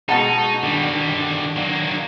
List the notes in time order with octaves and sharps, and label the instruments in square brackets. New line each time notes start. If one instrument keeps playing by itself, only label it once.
[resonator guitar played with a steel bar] B2 F#5 A5 [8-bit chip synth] G#3 G#4 [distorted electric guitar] D#4
[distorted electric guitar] D3 G3 [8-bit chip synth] D#3 D4
[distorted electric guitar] F#3 A#3